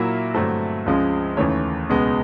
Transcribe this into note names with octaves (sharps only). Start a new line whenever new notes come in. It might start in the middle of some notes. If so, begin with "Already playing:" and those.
Already playing: A#2 F#3 A#3 E4 E5
G2 D3 F#3 A3 C4
C#2 C#3 F3 G#3 C4
D#2 C#3 E3 A3 C#5
C#2 B2 G#3 B3